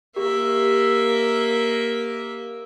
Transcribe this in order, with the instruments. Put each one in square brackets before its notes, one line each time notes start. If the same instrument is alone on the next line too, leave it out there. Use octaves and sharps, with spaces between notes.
[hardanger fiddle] A#3 E5 [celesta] G4